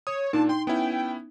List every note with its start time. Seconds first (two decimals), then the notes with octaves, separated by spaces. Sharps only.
0.07 C#5 D#6
0.33 A#2 D4 D#4 A5
0.49 G5 C6
0.67 B3 C#4 E4 G5